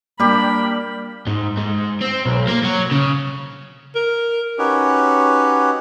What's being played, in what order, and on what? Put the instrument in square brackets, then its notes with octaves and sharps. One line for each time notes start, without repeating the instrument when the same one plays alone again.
[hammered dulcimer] G3 G4 [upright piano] A#3 [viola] D4 B5
[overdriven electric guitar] G#2
G#2
C4
B1
A#3
F#3
C#3
[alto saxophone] A#4
[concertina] C#4 D#4 F#4 G4 B4 C#5